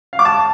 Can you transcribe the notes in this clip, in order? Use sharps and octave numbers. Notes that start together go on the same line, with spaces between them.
F5
D6
A5